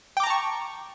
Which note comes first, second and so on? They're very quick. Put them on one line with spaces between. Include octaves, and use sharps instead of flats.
G5 D6 A#5 A5 C#6